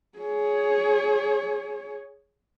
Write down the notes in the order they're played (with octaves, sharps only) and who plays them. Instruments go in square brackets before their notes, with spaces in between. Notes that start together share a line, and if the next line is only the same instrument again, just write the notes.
[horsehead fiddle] G#4 C#5